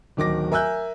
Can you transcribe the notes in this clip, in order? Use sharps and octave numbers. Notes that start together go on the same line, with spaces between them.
D1 D#3 D6 A#6
A#4 E5 G#5 E6 F#6 G6